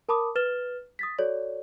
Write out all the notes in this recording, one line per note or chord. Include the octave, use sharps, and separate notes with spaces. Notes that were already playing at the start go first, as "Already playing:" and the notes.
A#4 A5 B5 D6 D#6
B4 F6 A6 E7 G7
D#6 A6 B6
F#4 A4 C#5 D5